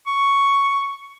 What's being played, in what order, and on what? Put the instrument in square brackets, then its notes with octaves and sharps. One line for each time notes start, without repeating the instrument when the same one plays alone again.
[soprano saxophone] C#6